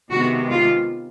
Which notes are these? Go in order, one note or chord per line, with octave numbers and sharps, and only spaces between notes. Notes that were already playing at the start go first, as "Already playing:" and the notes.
C3 D#3 G#3 B3 F#4
F4